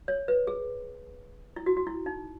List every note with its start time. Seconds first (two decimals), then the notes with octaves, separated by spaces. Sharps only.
0.08 C#5
0.28 B4
0.47 G#4
1.56 E4
1.66 F#4
1.77 F#4
1.87 E4
2.06 D#4